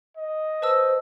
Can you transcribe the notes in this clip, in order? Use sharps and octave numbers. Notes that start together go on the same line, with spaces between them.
D#5
B4 C5 A5 E6